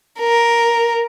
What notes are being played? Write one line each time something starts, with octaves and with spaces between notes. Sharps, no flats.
A#4